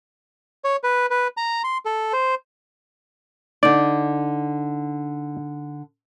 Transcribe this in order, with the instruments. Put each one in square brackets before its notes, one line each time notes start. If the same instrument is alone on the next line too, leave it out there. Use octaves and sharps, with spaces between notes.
[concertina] C#5
B4
B4
A#5
C6
A4
C5
[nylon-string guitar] D3 D#4 [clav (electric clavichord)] D5